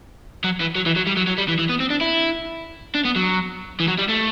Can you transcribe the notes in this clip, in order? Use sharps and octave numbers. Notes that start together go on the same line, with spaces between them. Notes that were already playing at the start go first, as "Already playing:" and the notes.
F#3
E3
F#3
E3
F#3
G3
F#3
F#3
G3
E3
E3
B3
C4
D4
E4
D4
B3
F#3
E3
F#3
G3
A3